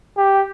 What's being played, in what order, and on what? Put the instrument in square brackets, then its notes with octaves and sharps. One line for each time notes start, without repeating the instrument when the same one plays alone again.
[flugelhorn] G4